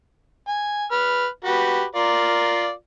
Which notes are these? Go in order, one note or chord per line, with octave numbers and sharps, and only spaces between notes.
G#5
B4 F6
F#4 G4 B4
F4 A#4 D5